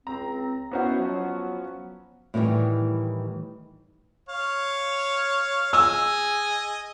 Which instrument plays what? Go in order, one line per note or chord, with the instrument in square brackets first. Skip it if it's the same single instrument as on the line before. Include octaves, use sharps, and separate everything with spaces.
[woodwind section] C#2 C4 [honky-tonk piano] A#5
[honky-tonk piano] B3 C#4 F#4 [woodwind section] D#4 E4 C5
[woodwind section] F3 F#3
[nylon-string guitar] A2 D#3 E3 G3
[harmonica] C#5 F5
[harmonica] G#4 D#5 G#5 [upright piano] E6